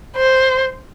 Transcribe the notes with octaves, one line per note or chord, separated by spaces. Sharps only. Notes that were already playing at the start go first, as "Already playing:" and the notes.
C5